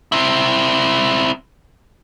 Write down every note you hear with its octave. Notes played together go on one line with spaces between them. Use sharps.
C4 E4